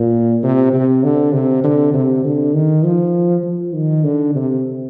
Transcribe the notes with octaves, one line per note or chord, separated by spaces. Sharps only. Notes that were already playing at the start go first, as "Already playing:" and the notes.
Already playing: A#2
C3
C3
D3
C3
D3
C3
D3
D#3
F3
F3
D#3
D3
C3